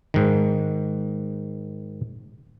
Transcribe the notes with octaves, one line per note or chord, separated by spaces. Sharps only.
G#2 D#3